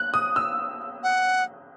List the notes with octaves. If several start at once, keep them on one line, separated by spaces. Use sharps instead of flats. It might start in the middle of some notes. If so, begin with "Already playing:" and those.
Already playing: F#6
D#6
E6
F#5